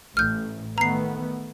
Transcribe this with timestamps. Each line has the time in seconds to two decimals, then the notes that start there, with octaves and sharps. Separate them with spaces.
0.17 A1 F6 G6
0.78 D#3 A3 B3 A#5 C7